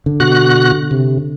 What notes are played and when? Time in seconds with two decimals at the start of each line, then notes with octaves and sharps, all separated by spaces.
0.06 D3
0.20 B2 F#4 F#6
0.91 C3